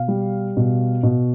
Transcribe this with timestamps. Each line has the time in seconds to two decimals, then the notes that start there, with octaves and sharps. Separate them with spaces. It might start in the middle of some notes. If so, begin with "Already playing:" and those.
Already playing: B2 F5
0.08 G3
0.57 B2
1.03 B2